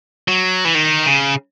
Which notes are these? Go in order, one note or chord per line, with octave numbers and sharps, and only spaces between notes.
F#3
E3
D#3
C#3